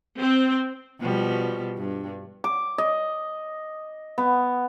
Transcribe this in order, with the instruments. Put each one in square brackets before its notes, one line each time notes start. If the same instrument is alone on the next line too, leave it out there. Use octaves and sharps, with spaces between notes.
[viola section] C4
[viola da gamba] B2 F3 G3
G2
[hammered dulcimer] D6
D#5
B3